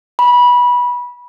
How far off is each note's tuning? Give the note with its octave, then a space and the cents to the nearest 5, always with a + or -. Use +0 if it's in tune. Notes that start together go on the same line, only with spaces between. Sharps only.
B5 -20